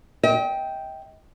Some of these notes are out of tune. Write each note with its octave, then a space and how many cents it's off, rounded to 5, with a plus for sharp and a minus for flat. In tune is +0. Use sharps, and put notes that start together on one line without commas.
D#5 +45 G5 +0